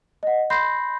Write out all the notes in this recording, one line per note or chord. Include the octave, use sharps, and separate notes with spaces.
D#5 F#5
B5 C6 G6 A#6 C7